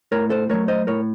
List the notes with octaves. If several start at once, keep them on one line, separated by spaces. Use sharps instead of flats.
A2 A#4 C#5
A4 C5
F#3 A3 A#4 C#5
C5 D#5
A2 A#4 C#5